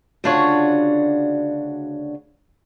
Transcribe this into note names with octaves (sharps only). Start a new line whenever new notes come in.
D2 C#3 D4 F4 F#4 C#5